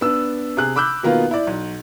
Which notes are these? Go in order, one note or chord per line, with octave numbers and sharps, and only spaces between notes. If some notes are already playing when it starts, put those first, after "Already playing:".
B3 D4 E6
C3 G#4 F#6
B5 D6 E6 F#6 G6
B2 D#3 A#3 B3 F4
E4 D5
B1